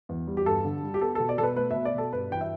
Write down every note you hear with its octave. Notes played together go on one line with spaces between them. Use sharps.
E2
G3
G4
G2 A4
D3
G3
G4
B3 A4
B2 A4
D5
B2 A4 B4
A3 B4
E5
B2
D5
B2 A4
G2 B4
E3 G5
E5